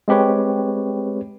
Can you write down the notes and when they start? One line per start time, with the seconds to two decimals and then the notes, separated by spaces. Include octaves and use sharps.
0.08 G#3 C4 G4 B4 C#5